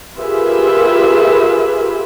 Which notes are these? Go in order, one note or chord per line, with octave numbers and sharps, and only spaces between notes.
F4 G4 G#4 A#4 B4 E5